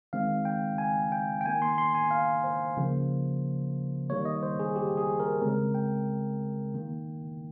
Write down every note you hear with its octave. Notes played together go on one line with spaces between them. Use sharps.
D#3 G#3 C4 F5
G5
G#5
G5
G5
D#3 A#3 G#5
C6
C6
G#5
F5
C5
C#3 F3 A#3
D#3 G3 A#3 C#5
D#5
C5
G#4
G4
G#4
A#4
C#3 G#3 C4 A#4
G5
D#3 A#3